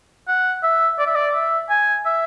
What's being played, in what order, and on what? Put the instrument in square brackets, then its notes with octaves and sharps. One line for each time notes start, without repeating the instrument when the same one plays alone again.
[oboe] F#5
E5
D5
E5
D5
E5
G#5
E5